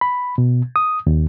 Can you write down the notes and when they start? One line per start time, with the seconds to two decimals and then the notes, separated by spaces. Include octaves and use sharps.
0.01 B5
0.38 B2
0.76 D#6
1.07 D#2